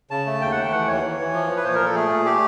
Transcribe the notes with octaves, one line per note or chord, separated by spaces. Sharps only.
C#3 A5
A3
D#2 G5
F#5
A3 G5
E3 F#5
D#2 C#5
E3
E3
F3
F3
B4
A#2 C5
A#4
A#2 A4
A3 G#4
A#2
A3 G4